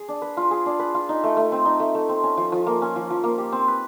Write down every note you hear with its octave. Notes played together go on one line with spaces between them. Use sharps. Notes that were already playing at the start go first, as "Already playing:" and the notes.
Already playing: G#4
D4
B4
F4
G#4
D4
B4
F4
D#4
A3
A3
C4
D#4
A3
A3
C4
C#4
F3
F3
A#3
C#4
F3
F3
A#3
G4
C4
B4